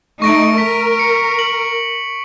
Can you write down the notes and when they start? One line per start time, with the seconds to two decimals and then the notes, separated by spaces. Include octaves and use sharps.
0.22 A3 D#4 C#6 A#6 D7
0.58 A#4 B6
0.99 C#7
1.39 F#7